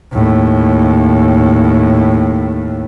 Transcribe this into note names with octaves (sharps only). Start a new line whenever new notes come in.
D#2 A2